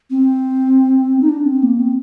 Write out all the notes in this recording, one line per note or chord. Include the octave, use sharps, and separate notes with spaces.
C4
D#4
D4
C4
A#3
C4